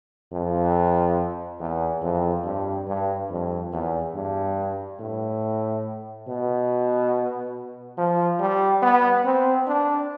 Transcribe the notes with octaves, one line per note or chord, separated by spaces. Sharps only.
F2
E2
F2
G2
G2
F2
E2
G2
A2
B2
F3
G3
B3
C4
D4